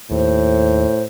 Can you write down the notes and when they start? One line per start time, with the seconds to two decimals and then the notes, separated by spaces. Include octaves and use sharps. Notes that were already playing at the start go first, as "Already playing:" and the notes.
0.11 D#2 A2 C5